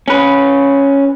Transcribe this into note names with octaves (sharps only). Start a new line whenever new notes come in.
C#4 B4